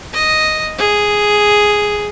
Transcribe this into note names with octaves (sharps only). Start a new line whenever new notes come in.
D#5
G#4